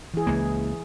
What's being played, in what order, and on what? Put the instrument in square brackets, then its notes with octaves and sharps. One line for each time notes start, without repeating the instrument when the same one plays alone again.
[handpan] E3 G#4
[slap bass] C#2 A#3